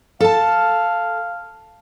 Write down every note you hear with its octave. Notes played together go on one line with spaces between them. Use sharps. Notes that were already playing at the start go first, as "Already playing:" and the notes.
A4 F5 A5